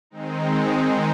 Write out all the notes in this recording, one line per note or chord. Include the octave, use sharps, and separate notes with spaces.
D#3 G#3 C4 D#4